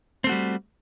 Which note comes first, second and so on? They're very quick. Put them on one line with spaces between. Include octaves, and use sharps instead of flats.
C4 A3 F#4 G3